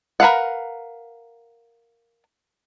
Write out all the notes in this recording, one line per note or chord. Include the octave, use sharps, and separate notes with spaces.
A#4 B4 F5 F#5